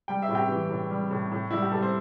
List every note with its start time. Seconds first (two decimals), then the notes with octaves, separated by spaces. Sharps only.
0.08 G3 G5
0.22 E5
0.29 A2
0.35 G4 G5
0.49 E3
0.70 A2
0.91 G3
1.11 A2
1.32 A2
1.51 G3 E4
1.62 G4
1.72 G3 A4
1.82 C5